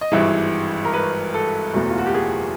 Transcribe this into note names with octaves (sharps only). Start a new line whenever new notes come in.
D#5
G#1 G2 E3 G#3 E5
A#4
B4
A4
F#1 E2 B2 F#3 A3
F4
F#4
G4
G#4